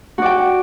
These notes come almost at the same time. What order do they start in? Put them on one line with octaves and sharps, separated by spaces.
F#4 D5 G5